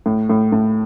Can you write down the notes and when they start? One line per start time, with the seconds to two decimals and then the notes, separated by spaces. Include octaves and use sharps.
0.06 A2
0.29 A2
0.52 A2